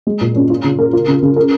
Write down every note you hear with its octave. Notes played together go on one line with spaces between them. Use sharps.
G#3
A#2
C#4
F4
C#3
A#4
F4
C#3
C#3
A#4